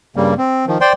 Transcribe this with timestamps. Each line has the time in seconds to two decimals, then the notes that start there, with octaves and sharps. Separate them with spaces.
0.16 G2 C#3 G3 A#3
0.38 C4
0.67 D#3 F3
0.81 C5 D5 G5 C6